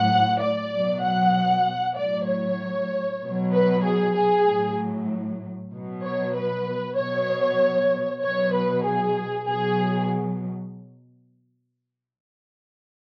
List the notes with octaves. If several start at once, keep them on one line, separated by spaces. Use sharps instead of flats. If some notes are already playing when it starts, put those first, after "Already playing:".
Already playing: A2 F#3 F#5
D5
B2 F#3
F#5
A2 F#3 D5
C#5
B2 F#3
B4
G#4
G#4
A2 F#3
B2 F#3
C#5
B4
B2 F#3 C#5
B2 F#3 C#5
B4
G#4
B2 F#3 G#4